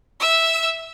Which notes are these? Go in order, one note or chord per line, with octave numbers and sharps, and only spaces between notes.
E5 E6